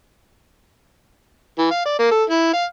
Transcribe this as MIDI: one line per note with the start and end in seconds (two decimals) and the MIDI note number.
1.59 1.66 52
1.71 1.83 77
1.85 1.96 74
1.99 2.09 58
2.11 2.23 69
2.30 2.52 64
2.53 2.65 77